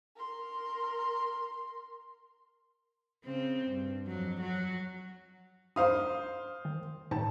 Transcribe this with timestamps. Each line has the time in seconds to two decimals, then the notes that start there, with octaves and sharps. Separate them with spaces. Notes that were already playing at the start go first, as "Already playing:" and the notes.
0.16 A#4 C6
3.24 C#3 C4
3.67 G2
4.07 F2 F#3
4.40 F#3 F#4
5.76 D4 D#4 C5 F5 D#6
6.65 D#3
7.11 A2 D#3 D#4 A5